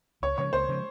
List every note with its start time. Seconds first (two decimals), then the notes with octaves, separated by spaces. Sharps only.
0.22 C#2 C#5
0.38 C#3 F3 G#3 C#5
0.53 C#2 C5
0.68 C#3 F3 G#3